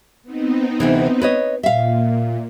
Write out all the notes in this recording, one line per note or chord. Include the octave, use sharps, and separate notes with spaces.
B3 C4 D#4
D2 C3 E3
B4 C#5 D#5
A#2 E5 F5